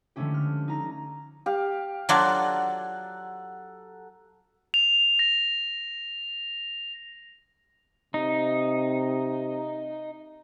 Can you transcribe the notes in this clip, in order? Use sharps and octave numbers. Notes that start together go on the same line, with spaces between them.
D3 F3 G#3 A3 C#4 G4
F6
D#4 A#5 A#6
G4 F5
F#3 D4 F4 A4 F#5 A#5
F7
A#6
C3 D#4